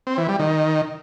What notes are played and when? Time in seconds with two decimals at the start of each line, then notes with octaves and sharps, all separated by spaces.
0.07 C4
0.18 E3
0.29 G3
0.39 D#3